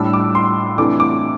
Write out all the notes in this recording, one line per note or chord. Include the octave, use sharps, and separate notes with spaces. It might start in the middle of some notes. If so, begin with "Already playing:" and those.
Already playing: A2 G3 D4 E6
D6
C6
C3 E3 A3 D4 D6
D6